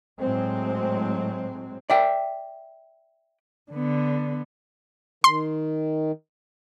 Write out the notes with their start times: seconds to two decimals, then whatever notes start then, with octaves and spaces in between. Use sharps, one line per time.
0.21 A2 F#3 G#3 C4
1.90 D5 E5 G5
3.72 D3 B3
5.24 D#3 C6